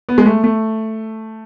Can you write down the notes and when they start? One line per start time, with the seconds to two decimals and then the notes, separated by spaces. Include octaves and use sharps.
0.09 B3
0.18 G#3
0.26 A3
0.44 A3